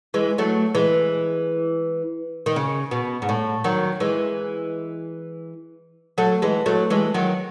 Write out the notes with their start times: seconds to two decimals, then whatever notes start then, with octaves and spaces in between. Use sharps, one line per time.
0.14 E3 G#3
0.38 F#3 A3
0.75 E3 G#3
2.46 D#3
2.56 C#3
2.91 B2
3.22 G#2
3.29 A2
3.64 D#3 F#3
4.00 E3 G#3
6.18 F#3 A3
6.42 E3 G#3
6.66 F#3 A3
6.90 E3 G#3
7.14 D#3 F#3